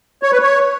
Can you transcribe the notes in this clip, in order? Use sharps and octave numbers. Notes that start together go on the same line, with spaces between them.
C#5
B4
C#5